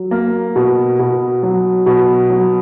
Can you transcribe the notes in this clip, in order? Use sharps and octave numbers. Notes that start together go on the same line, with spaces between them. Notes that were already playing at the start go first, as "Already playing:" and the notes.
Already playing: F#3
A#3
B2
B2
F#3
B2
F#3